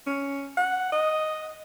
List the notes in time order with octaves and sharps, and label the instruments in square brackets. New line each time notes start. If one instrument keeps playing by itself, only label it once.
[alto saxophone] C#4
F#5
D#5